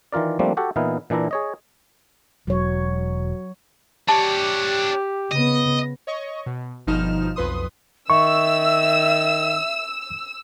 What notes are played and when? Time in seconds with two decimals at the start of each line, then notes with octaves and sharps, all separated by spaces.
0.12 D#3 E3 F4 A#4 D5
0.39 F3 G3 A3 A#3 C4 D4
0.57 F#4 G4 A4 F#5
0.76 A#2 E3 B3 D#4 E4 F5
1.10 A#2 E3 D4 E4 A#5
1.31 G#4 C#5 D#5
2.47 E1 F#3 C#5
4.09 D4 G4 C#5 A5
5.31 C#3 B3 D#5
6.07 C#5 D#5 C#6
6.46 B2
6.87 G1 B2 F3 D#4 F6 E7
7.36 B1 F2 B4 C6 D#6
8.10 D#3 E5 C#6 E6